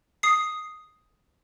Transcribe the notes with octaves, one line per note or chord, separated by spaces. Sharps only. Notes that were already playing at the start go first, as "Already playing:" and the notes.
D#6 C7